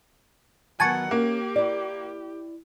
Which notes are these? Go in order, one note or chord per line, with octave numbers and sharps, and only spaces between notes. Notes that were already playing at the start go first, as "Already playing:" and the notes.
D#3 F#3 B3 F#5 G#5 A5 C#6
A#3 C#4 G4
E4 D5